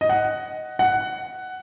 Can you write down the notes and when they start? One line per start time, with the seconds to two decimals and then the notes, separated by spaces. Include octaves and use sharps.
0.01 D#5
0.09 F#5
0.79 F#5